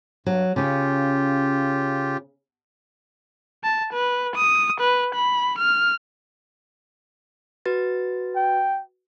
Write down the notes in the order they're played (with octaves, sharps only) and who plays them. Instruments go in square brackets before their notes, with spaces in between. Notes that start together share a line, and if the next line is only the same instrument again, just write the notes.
[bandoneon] G2 [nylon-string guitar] F#3
[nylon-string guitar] C#3 C#4 [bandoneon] F4 G4
[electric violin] A5
B4
D#6
B4
B5
F6
[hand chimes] F#4 B4 A6
[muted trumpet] G5